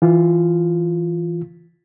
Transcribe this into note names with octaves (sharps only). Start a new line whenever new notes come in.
E3 F4